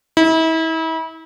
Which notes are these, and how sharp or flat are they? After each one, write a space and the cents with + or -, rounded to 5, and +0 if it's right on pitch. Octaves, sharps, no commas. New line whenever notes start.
E4 -35